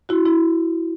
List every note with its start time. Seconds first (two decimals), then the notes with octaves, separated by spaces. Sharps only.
0.09 E4 F#4
0.25 E4